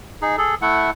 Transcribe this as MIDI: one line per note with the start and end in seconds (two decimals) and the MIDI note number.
0.22 0.36 63
0.22 0.36 68
0.38 0.55 68
0.38 0.55 69
0.62 0.90 57
0.62 0.90 64
0.62 0.90 78